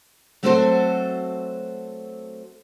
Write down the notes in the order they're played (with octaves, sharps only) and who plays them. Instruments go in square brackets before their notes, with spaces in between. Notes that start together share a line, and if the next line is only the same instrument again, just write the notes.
[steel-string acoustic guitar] F#3 A3 C4 F#4 A4 C5